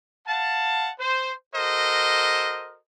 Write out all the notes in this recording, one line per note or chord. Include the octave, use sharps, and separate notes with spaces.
F5 F#5 A5
C5
F#4 A4 A#4 C5 D#5